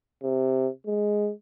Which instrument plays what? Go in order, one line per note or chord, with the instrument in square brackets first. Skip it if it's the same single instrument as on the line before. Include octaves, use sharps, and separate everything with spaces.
[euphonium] C3
G#3